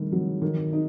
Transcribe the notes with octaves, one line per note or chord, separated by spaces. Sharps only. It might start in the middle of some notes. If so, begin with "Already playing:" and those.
Already playing: G2 D#3 A3
F#3
D#3
D#4